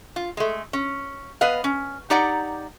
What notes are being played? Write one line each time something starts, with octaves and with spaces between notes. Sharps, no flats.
F4
G#3 A3
C#4
B3 B4 D#5 F5
C#4
D#4 G4 D5 F#5 A#5